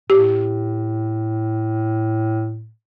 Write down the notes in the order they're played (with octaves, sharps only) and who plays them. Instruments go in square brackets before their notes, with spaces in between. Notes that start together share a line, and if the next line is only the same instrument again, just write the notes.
[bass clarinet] A2 [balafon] G4